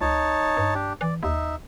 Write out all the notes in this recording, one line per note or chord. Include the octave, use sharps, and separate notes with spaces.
C#2 D#4 C#5 A5
G2
D4 G4
E3 D5
D#2 D#4 E5